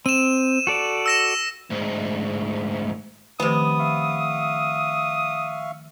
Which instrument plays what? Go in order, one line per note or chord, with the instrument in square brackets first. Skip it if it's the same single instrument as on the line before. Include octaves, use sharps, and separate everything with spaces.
[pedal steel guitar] C4 [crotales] D#7 E7
[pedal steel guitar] F#4 A4 D5
[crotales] E6 A#6 E7
[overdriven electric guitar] D2 G#2
[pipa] C3 B3 [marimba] D#3 F3 A3 [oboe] D#6
[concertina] E5 F5 C#6